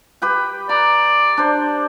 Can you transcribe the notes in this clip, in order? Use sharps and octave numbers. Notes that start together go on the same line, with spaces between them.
G4 B4 G5
D5 A#5
D4 C5